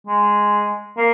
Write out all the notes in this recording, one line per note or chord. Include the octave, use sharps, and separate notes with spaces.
G#3
A#3